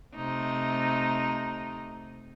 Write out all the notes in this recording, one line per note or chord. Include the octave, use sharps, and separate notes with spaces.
C3 A3 D#4